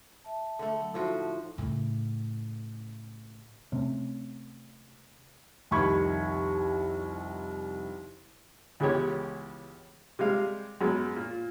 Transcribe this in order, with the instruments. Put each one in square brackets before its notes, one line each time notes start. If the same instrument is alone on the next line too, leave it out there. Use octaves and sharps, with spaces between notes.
[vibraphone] E5 A5
[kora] D3 A3
[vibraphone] F#3 F#5
[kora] A2 F3 F#4 [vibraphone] D#4 E4 C6
[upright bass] A2 C#3
[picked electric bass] C3 A3 C4 C#4
[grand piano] C2 F2 D#3 B5 C#6 G#6
[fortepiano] C#2 E3 G#3 B3 G4 C#5
C3 G3 G#3 F5
F#2 G#3 B3
A#2